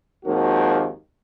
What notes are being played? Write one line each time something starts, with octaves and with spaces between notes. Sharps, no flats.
G#1 D#2 D#3 F3 A#3 F#4